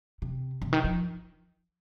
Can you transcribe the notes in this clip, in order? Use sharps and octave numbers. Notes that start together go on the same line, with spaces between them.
C3
C3
D#3
F3